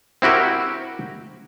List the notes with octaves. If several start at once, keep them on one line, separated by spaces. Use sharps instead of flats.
C4 E4 F#4 G4 A#4